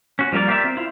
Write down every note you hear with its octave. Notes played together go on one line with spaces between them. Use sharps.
C#4 F#4
F3 G3 A#3 A#4 D5
F4 G4 A#4 D5 E5
C4
E4 F4